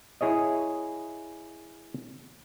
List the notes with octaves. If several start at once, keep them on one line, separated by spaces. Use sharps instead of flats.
E4 G#4 C#5 D#5